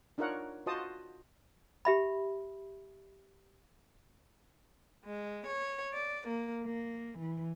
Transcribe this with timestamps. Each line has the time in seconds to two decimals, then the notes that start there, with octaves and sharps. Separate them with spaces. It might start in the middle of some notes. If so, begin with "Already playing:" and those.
0.18 D4 D#4 F4 A#4 C#5 F#5
0.66 F4 F#4 C5 D#5 A5 D#6
1.85 G4 E5 B5
5.05 G#3
5.46 C#5
5.92 D5
6.28 A#3
6.66 A#3
7.20 E3